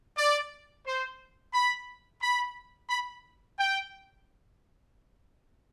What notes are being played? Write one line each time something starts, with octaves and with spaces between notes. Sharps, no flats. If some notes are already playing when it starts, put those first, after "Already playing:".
D5
C5
B5
B5
B5
G5